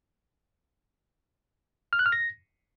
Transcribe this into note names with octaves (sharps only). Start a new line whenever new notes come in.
F6
F#6
F6
A#6